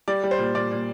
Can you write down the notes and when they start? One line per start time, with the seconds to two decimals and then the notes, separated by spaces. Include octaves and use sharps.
0.08 G3 D5
0.24 G3
0.31 C5
0.39 A#2
0.55 A#2 D5
0.72 A#2